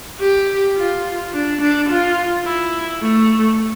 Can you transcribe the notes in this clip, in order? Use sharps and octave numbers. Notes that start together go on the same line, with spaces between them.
G4
F4
D4
D4
F4
E4
A3